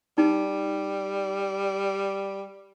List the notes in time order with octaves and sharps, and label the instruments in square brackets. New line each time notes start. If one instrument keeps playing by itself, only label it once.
[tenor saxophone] G3 [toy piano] D#4